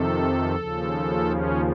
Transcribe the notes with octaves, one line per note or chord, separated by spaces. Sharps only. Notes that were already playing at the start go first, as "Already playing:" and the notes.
Already playing: F2 C3 D#3 A4
D#2 C#3 F3
C#4